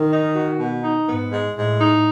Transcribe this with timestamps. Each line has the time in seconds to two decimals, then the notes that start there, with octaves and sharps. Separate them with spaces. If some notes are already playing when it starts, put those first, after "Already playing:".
Already playing: D#3
0.10 D#4
0.34 F#4
0.59 B2
0.83 D#4
1.07 G#2 B3
1.31 G#3
1.55 A2 G#3
1.80 D#4